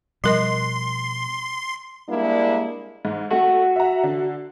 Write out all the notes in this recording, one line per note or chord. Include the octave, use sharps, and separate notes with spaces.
B2 F3 G3 A#4 D#5 C6
G3 G#3 A#3 D4 E4
G#2
A3 F#4
E5 A#5
D3